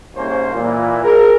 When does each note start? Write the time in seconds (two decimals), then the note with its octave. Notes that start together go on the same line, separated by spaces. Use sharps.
0.15 C2 G#2 A#3 C#4 C5
0.54 A#2 E3
1.03 G#4 A#4